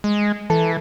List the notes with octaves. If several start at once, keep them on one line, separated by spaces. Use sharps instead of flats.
G#3
E3 A4 A5